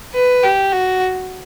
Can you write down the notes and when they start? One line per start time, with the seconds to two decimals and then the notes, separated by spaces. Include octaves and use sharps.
0.14 B4
0.44 G4
0.72 F#4